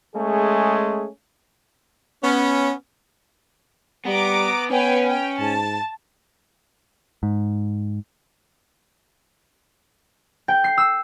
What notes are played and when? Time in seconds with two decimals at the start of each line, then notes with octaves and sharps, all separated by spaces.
0.15 G#3 A3 C#4 G#4
2.24 B3 C#4
4.06 G3 B3 A#5 D6
4.71 B3 C#4 B4 G5 G#5
5.06 G5
5.40 G#2 A5
7.23 G#2
10.48 G5
10.64 C7
10.78 E6